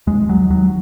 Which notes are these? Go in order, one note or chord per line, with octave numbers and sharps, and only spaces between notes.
D#2 G#3
F#3
D#2 F#3